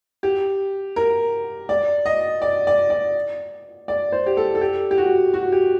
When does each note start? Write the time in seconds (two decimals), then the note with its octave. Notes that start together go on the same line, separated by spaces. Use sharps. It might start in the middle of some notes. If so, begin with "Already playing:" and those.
0.23 G4
0.96 A#4
1.69 D5
2.06 D#5
2.42 D5
2.67 D5
2.90 D5
3.88 D5
4.12 C5
4.26 G4
4.37 A4
4.55 A4
4.61 G4
4.91 G4
4.98 F#4
5.34 F#4
5.52 G4